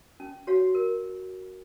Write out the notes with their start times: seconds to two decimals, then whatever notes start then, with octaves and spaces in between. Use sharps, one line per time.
0.20 C#4
0.47 F#4 C#5 F5
0.75 A#4